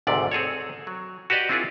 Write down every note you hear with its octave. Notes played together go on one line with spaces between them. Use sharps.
G#1 D2 G#2 C3 D5
C4 G#4 A4 C#5
F#3
F#4 G4 B4 D5 D#5
C4 D4 E4 F4 G#4 A#4